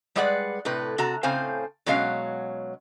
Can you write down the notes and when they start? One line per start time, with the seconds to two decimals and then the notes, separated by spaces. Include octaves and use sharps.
0.15 G3 G#3 G#4 B4 D5 F#5
0.65 A2 C3 B4
0.98 C3 F#4 A5 A#5
1.23 A2 C#3 C4 C5 F5 G#5
1.86 B2 F#3 G#3 C#4 F5